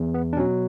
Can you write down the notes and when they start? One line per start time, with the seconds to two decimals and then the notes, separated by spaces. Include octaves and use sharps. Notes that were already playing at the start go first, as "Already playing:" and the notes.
Already playing: E2
0.14 B3
0.33 D4
0.37 B2 C#4
0.40 F#3